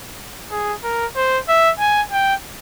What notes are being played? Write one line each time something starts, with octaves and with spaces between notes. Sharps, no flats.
G#4
A#4
C5
E5
G#5
G5